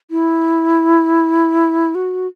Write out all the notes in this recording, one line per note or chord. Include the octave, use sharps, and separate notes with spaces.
E4
F#4